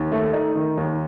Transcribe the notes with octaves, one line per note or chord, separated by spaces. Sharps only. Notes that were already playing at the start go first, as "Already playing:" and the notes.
Already playing: D#2
A3
D#4
D#3
D#2